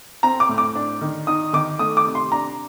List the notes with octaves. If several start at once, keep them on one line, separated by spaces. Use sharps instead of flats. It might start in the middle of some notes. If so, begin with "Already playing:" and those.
C4 A#5
D6
A2
D6
D4
D#3
D#4 D#6
D#3 D6
A3 D#6
D6
C3
C6
D4 A#5